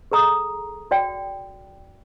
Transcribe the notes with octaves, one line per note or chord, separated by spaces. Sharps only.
G#4 A4 A#5 D#6
F#4 D5 G5